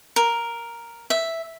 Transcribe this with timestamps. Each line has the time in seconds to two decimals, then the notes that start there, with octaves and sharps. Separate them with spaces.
0.16 A#4
1.10 E5